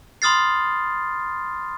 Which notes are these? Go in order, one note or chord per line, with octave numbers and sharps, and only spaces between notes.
B5 C6 D#6 F6 A6 C7